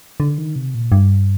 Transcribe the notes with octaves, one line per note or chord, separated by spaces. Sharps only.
D3
D#3
C3
A#2
G2